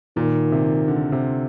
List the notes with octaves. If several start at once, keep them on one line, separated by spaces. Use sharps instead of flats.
A#2 D#3
C3
D3
C3